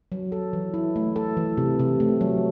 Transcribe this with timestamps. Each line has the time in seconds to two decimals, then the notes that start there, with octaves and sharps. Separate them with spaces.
0.12 F#3
0.32 A4
0.53 E3
0.74 E4
0.96 A3
1.16 A4
1.37 E3
1.57 C3
1.79 C3
2.00 A3
2.21 F#3